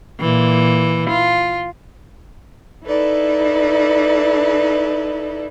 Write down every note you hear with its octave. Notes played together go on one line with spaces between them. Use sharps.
A#2 E3
F4
D#4 E4 A4 B4 D5